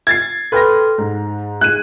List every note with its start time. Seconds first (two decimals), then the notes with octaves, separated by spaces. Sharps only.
0.07 G#6 A6 C7
0.52 A4 B4 G5 C6 F6 A#6
0.98 G#2 D#4
1.61 G#3 D#4 F#6 G#6 D#7